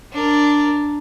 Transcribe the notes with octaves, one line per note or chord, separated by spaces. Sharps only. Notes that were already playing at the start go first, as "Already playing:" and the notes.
D4 A#4